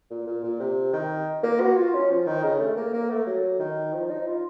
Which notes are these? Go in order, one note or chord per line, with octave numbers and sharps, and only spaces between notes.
A#2
A#2
A#2
C3
D#3
A#3
F#4
F4
C#4
F3
D#3
C#3
A3
A#3
A#3
A3
F#3
D#3
F3
D#4
F4